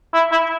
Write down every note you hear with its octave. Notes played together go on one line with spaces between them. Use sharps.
E4
E4